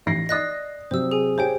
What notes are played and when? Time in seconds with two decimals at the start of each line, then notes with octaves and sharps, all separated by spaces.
0.06 A1 A#6 C7
0.29 D5 D#5 D#6 F#6 A#6
0.91 C3 F#3 C5 E6
1.11 G#4 G#5
1.38 G4 C5 C#5 G5 G#5